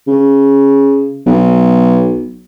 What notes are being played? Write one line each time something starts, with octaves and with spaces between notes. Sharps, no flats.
C#3
B1